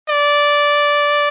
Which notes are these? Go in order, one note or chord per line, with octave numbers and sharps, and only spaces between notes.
D5